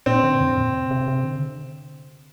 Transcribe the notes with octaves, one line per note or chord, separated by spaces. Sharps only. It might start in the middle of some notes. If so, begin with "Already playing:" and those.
A#2 C4
D3
F2
A#2
C3
C3
C3
D3